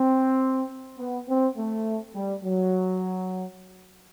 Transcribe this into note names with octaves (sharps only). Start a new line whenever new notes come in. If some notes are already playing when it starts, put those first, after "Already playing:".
Already playing: C4
B3
C4
A3
G3
F#3